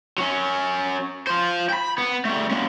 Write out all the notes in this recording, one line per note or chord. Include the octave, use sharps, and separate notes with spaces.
F#3 C#4
F4 C5
G5 B5
B3
G3 A3
A#3 C#4